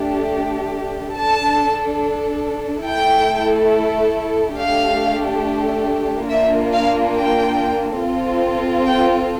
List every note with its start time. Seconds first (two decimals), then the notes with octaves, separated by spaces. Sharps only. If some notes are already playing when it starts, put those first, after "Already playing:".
Already playing: A3 D4 G4
1.16 D4 A4 A5
2.87 A3 E4 A4 G5
4.58 A3 D4 G4 F5
6.29 A#3 D4 F4 E5
6.73 F5
7.15 G5
8.01 C4 F4 A4
8.86 G5